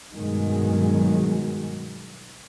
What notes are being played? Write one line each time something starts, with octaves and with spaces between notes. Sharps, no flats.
G2 B2 D#3 F#3 G#3